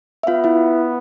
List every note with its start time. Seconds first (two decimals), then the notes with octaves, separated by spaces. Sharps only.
0.23 E5
0.27 B3 F4 F5
0.44 E4 E5